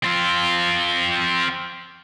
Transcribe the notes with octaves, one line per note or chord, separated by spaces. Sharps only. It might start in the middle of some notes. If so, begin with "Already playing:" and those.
C4 F4